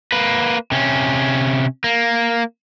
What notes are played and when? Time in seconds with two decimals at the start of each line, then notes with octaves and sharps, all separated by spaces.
0.12 A#3 B4
0.72 C3 C#4
1.84 A#3